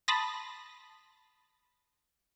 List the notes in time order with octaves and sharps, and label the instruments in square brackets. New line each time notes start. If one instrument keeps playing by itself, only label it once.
[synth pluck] A5 B5 C6 D#6 A6 A#6